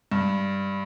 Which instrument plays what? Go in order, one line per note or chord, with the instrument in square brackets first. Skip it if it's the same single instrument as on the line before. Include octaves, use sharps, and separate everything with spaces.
[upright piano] G2